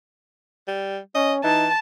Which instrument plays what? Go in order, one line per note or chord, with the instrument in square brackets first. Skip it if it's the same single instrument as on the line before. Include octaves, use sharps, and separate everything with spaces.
[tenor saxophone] G3
[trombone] C#4 [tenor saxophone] D#5
[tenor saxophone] E3 [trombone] D#4 [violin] A5